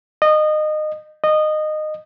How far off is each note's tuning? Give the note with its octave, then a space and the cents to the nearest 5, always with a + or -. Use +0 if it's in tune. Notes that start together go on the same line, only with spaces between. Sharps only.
D#5 -25
D#5 -20